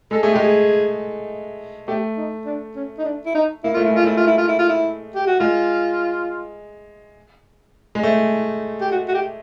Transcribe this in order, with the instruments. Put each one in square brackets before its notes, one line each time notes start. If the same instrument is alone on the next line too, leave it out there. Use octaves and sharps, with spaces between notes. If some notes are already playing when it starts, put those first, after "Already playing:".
[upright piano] G#3 [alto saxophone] A4
[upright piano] A3 [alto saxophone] G#4
[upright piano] G#3 [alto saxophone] G4
[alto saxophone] G#4
[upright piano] A3 [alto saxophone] G4
[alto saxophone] D#4
D4
C#4
D#4
D4
E4
D#4
[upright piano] A#3 [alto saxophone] E4
[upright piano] A3 [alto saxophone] F4
[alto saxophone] E4
[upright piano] G#3
[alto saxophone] F4
[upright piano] A3 [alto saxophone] E4
[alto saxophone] F4
E4
F4
E4
F4
E4
G4
F#4
[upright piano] G#3 [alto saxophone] F4
[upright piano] G#3
A3
[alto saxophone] G4
F#4
F#4
G4